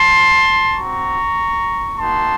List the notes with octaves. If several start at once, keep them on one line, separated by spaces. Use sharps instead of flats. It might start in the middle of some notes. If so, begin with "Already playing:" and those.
Already playing: A5 C6
C4 F#4 A#5 C#6
A#3 D#4 F#4 A5 C6